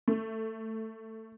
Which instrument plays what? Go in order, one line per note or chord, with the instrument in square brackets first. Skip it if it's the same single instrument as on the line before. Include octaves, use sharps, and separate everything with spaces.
[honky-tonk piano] A3